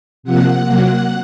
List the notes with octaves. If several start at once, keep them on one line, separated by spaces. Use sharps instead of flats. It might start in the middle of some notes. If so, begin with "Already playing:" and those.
C3 F3 A#3 F#5
C3 F#3 A#3